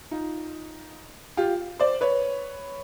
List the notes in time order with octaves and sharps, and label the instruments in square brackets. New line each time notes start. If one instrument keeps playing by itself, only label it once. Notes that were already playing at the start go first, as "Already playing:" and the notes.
[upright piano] D#4 F4
F4 G4
C5 D5
B4 C#5